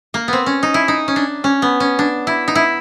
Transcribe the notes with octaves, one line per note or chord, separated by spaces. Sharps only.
A#3
B3 C4
C#4
D#4
E4
D#4
C#4
D4
C#4
B3
C#4
D4
E4
D#4
E4